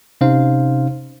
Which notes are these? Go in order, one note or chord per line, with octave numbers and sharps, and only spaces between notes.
C3 C#4 D#4 C5 F5